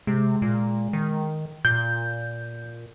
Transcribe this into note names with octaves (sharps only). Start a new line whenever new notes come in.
C3 G#3
A#2
D#3
A#2 G6